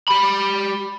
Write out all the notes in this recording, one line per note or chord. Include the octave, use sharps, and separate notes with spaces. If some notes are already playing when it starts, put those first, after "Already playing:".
G4 B5